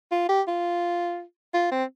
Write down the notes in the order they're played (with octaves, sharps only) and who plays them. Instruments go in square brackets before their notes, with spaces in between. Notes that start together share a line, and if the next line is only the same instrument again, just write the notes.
[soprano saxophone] F4
G4
F4
F4
C4